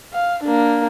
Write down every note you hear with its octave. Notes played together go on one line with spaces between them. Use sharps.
F5
A#3 D4